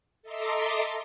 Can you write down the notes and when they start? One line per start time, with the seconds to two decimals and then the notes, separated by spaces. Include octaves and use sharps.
0.22 A4 D#5 E5 A#5 C6 D6